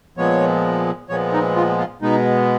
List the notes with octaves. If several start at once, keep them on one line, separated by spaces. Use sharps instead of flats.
A#2 F3 G#3 B3 C#5
A#2 F3 G#3 B3 C#5
D#4
F4
F4
B2 G#3 B3 D#4